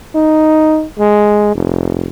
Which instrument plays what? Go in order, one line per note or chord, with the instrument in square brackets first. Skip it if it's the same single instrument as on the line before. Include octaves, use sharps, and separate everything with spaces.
[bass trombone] D#4
G#3
F1